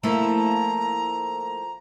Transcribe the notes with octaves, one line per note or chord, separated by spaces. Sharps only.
F3 A3 A#3 E4 A4 A#5